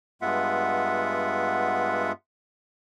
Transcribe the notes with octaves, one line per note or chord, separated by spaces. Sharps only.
G2 G#3 B3 F4 E5 F#5